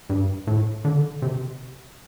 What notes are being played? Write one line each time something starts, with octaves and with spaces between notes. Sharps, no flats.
G2
A2
D3
C3